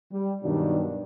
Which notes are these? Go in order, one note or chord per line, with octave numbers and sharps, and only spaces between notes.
G3
G2 B2 D#3 F#3 G3 D4